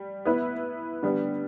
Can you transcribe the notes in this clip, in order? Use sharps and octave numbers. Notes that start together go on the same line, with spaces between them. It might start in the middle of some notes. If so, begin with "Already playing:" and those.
Already playing: G3
B3 E4 B4
D3 G3 B3